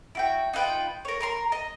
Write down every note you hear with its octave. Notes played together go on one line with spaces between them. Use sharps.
E4 F#4 G5
D#4 F4 B4 G5
A#4 C#5
A#4 A#5 C6
D#5